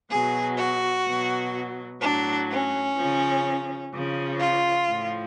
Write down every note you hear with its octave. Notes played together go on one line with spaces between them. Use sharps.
B2 F#3 G#4
F#4
B2 F#3
A2 F#3 D4
C#4
C#3 F3
C#3 F3
F4
A2 F3